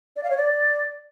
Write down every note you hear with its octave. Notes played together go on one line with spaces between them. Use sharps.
D5
F5
C#5
D5